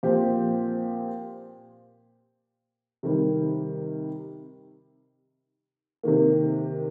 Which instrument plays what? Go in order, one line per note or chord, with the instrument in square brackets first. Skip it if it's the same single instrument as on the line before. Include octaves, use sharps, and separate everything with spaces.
[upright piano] A#2 F3 C4 G4
C3 D#3 G3
C3 D#3 A#3